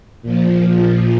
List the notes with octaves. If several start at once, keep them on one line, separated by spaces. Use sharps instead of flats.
A#2 F3